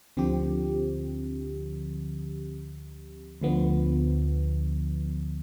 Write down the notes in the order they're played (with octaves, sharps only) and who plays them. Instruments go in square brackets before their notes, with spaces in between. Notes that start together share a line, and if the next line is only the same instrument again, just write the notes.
[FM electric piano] D2 D3 F3 C4 G4
D2 D3 F3 B3